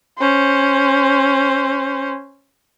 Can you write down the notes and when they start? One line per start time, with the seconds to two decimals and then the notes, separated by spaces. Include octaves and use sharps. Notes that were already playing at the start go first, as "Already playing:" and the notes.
0.18 C#4 C5